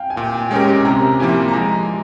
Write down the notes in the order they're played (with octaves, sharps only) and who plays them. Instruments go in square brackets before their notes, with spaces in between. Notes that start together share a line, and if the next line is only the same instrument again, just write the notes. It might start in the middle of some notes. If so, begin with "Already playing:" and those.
Already playing: [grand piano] F5 G5 G#5
G#5
[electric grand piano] A#2 [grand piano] G5
[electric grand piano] G#3 C#4 G4 A#4 [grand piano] G#5
[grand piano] G#5
[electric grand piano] C3 [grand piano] A#5
[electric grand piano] F3 A#3 E4 G4 [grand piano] G#5
[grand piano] A#5
[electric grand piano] G#3 [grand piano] G#5